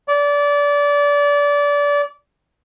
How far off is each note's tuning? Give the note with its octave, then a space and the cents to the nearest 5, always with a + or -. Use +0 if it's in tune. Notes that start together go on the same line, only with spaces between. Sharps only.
D5 -25